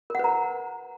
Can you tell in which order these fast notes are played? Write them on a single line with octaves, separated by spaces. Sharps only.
A#4 F#5 B4 A#5